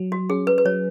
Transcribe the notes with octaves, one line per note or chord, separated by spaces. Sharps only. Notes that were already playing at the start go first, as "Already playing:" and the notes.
Already playing: F#3
F#4
C#4 G#4
B4
B4
F#3 C#5